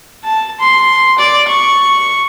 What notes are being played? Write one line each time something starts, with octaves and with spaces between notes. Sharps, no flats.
A5
C6
D5
C#6